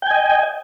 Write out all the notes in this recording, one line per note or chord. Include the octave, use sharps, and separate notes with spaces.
D#5 G5 G#5